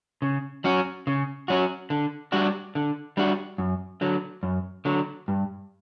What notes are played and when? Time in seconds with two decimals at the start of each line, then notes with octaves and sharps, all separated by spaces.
0.22 C#3
0.64 F#3 C#4 F#4
1.07 C#3
1.48 F#3 C#4 F#4
1.90 D3
2.32 G3 D4 F#4
2.75 D3
3.17 G3 D4 F#4
3.58 F#2
4.01 D3 F#3
4.43 F#2
4.85 D3 F#3
5.28 G2